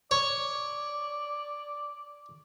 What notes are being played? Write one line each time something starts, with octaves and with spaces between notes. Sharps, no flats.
C#5 D5